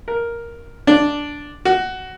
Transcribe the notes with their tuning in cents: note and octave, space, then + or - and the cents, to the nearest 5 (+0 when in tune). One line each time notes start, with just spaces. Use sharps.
A#4 +5
D4 -5
F#4 +15